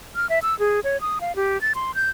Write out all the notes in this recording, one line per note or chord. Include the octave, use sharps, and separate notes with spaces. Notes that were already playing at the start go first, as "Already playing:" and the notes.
F6
E5
E6
G#4
C#5
D#6
F5
G4
A6
C6
G6